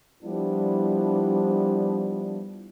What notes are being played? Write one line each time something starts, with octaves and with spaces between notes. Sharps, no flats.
F3 G3 B3 D4 E4